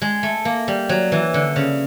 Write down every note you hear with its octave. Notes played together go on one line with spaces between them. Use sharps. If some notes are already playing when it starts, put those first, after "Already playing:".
G#3
A3
A#3
G3
F#3
E3
D3
C#3